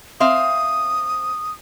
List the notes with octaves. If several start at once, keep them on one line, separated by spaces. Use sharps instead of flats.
C4 E5 F5 D#6